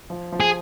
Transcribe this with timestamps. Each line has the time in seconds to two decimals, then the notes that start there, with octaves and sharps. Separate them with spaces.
0.10 F3
0.32 F3
0.40 G#4